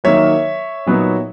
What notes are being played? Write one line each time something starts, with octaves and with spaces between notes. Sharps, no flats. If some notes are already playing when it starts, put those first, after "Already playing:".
D#3 F#3 A#3 C#5 E5
A#2 F#3 B3 D#4